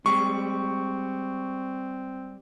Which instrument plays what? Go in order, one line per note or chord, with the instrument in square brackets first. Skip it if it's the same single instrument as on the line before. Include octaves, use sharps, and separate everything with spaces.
[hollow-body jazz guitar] G3 G#3 [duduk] C4 [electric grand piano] C#6